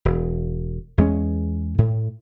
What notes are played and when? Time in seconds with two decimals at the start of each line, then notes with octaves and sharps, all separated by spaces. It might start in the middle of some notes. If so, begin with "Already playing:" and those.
0.05 E1
0.98 E2 G#3 C#4
1.78 A2